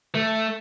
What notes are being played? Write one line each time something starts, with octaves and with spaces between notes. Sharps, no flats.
A3